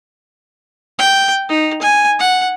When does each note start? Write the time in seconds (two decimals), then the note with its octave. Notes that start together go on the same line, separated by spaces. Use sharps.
0.98 G5
1.49 D#4
1.82 G#5
2.19 F#5